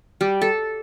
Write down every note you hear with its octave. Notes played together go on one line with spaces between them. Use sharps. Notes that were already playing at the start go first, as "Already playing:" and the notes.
G3
A4